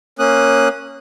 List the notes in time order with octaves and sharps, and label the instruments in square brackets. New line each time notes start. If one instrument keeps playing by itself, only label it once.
[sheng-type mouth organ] A#3 C#4 D#6 F#6